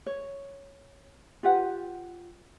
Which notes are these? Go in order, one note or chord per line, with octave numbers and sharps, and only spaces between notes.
C#5
F4 G4 B4 F#5